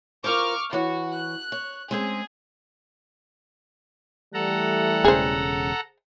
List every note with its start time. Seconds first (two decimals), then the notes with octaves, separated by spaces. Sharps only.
0.24 F4 A#4 C5 C#6 D6 F6
0.73 E3 F#4 C#5
1.12 F#6
1.52 C#5
1.91 G#3 C4 C#4 G#4
4.34 E3 G3 A3 A4 F#5 A#5
5.05 E1 C#3 G#4 C5